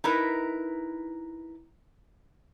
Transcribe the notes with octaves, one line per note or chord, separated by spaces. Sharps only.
D#4 E4 A#4 B4